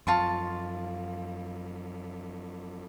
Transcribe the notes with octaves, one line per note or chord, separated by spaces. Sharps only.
F#2 F3 F4 A5 C#6